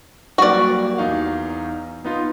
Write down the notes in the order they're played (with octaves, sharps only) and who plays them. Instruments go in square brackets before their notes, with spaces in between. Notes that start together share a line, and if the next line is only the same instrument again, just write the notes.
[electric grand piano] F#3 G3 A#3 [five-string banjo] F#4 D5
[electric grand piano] E2 D#4 F5
B3 D#4 F4